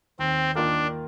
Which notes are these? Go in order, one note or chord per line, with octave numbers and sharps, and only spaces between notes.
D#2 C4
D#3 A#3 D4 F4 A#4